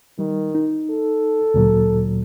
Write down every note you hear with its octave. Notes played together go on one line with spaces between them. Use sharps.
D#3 G3
D#4
A4
D2 A#2 F#3